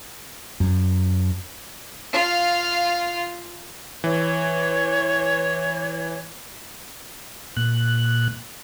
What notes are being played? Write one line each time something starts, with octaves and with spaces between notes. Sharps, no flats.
F#2
F4 F5
E3 C#5
A#2 F#6